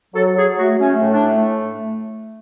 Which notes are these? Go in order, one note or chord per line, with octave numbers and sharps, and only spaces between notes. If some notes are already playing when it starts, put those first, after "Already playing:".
F#3 A4
F#3 G#4
A3 F#4
A3 C#4
A2
D4
A3